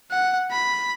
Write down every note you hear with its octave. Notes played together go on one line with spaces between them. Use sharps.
F#5
B5